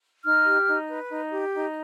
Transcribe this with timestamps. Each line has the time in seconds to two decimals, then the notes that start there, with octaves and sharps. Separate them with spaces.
0.24 D#4 F6
0.45 G4
0.67 D#4
0.88 B4
1.11 D#4
1.32 G4
1.54 D#4